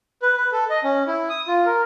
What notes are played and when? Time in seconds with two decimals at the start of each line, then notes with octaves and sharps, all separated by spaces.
0.22 B4
0.37 B4
0.52 A4
0.70 D#5
0.84 C#4
1.07 E4
1.29 D#6
1.48 F4
1.66 A#4